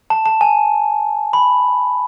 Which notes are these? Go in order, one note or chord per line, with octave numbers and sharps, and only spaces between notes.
A5
A5
G#5
B5